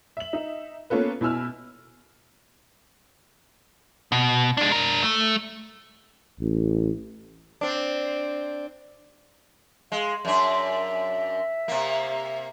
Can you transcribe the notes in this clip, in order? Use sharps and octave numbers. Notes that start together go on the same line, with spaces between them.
E5 F#7
D#4 E5
A#3 B3 C#4 F4 A4 B4
B2 E4 G#5 E6 F6
B2
G#3 D4
D4 A#4
A3
A1
C4 D4
G#3 F5
F#2 D4 E5
C3 A#3